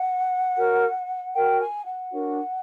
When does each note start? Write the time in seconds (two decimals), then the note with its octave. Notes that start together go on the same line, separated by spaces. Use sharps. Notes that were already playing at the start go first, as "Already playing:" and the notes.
Already playing: F#5
0.57 F#4 A#4 C#5
1.35 F#4 A#4 C#5 G5
1.61 G#5
1.86 F#5
2.11 D4 F#4 A#4 C#5